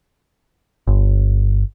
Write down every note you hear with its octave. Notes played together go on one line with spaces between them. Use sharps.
G1